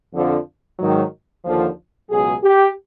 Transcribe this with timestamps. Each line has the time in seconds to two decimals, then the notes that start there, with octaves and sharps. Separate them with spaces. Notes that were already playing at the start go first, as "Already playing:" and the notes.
0.14 F2 D3 F3
0.79 G#2 D#3 F#3
1.45 D#2 D3 F3
2.11 C#2 B2 F#3 G#4
2.44 G4